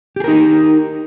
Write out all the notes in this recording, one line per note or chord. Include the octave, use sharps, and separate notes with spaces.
D#4 G4 G#4 A#4